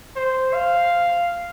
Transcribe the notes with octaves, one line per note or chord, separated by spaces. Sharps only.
C5
F5